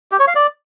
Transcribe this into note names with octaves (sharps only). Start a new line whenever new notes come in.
G4
C#5
F5
D5